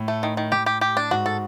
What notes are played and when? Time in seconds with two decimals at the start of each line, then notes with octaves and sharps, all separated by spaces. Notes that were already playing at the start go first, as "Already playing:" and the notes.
Already playing: A2
0.08 A3
0.23 D#3
0.37 D#3
0.52 A2 G4
0.66 G4
0.81 G4
0.97 D4
1.11 G#2 F#4
1.26 A4